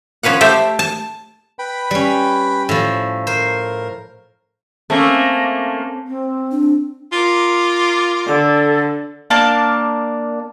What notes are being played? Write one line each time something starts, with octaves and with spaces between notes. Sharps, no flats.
F3 C#4 B4 F5 F#5
A3 G4 C5 E5
A5
B4 G5 B5
G3 C#4
A2 F3
A#4 C5
A3 A#3 C4 C#4
C4
D4
F4 A#4 D6
D3 A4
A#3 D4 A#4 A5